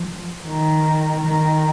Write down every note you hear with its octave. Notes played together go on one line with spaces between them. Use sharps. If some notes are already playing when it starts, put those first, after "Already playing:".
Already playing: F3
D#3
D#3